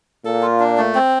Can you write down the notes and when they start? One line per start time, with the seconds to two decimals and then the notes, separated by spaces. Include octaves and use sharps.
0.25 A#2 A4
0.42 F4
0.60 D4
0.77 A3
0.95 C4